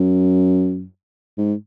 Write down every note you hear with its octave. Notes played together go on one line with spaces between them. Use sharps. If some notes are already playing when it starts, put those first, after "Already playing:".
Already playing: F#2
G#2